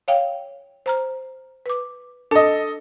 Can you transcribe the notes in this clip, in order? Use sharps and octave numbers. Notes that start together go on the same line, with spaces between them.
C#5 F5 G5
C5 A#5 F6
B4 D6
D4 A4 D#5